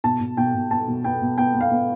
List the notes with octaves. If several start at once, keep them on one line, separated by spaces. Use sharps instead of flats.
B2 A5
B2
B2 G5
B2
B3 A5
B2
B3 G5
B2
B3 G5
B3
F5
B3